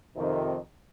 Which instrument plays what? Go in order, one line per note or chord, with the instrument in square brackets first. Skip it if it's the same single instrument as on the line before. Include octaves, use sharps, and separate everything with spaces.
[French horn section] F2 C3 D#3